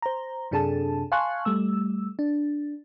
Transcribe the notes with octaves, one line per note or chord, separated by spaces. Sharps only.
C5 A#5
F#2 C3 D4 G#4 A4 A5
F5 G#5 A5 C6 C#6 F#6
G3 A3 E6
D4